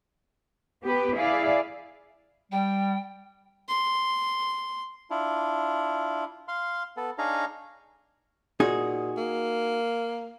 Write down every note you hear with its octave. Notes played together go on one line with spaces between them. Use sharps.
B3 G4 B4
E4 G#4 D5 F5
G3 G5
C6
D4 E4 F4
F5 C6
B3 A4
D4 D#4 G#4 C#5 F5 A#5
A#2 D#4 F#4 G#4
A#3